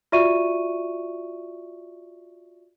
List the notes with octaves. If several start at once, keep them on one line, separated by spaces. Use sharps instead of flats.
F4 F#4 D5 E5 C#6 D#7